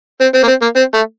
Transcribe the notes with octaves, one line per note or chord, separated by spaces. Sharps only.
C4
C4
A#3
C4
A#3
C4
A3